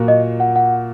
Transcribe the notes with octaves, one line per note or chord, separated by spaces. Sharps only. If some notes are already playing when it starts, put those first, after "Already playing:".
Already playing: A#2 A#3 F#4
D#5
F#5
F#5